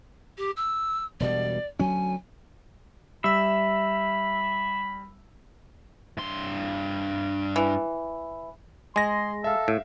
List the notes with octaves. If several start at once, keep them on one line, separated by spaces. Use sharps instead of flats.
G4
E6
E1 B2 G3 D5
D2 F#3 C#4 G#5
G3 E5 B5 E6
G2 C6
E3
G#3 G#4 C6 A#6
A4 E5 F5
A2